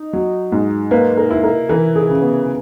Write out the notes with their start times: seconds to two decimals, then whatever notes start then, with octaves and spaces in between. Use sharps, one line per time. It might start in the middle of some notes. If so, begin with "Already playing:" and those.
Already playing: D#4
0.13 F#3
0.52 G#2
0.91 A#3 B4
1.17 A#4
1.31 E4
1.44 A#4
1.69 E3 A#4
1.96 G#4
2.09 C#3
2.22 B3